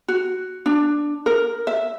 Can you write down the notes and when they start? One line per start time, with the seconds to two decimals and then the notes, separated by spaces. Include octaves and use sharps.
0.08 F#4
0.66 D4
1.26 A#4
1.67 E5